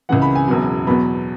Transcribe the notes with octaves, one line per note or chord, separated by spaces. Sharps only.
C#2 C#3 E3 F#5
B5
G#5
E1 E2 C#3 F#3
E2 B2 F#3 B5